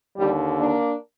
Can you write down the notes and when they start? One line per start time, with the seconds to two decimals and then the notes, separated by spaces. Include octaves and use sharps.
0.17 D#2 D3 G3
0.58 A#3 D4